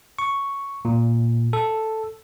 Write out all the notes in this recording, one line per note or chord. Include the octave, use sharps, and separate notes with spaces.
C#6
A#2
A4